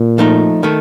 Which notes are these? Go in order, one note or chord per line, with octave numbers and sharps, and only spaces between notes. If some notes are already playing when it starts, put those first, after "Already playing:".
Already playing: A#2
F3 A3 D#4
D#3 A3